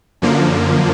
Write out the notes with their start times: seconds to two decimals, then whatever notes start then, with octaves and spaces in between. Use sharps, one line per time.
0.22 F#2 D3 F3 A#3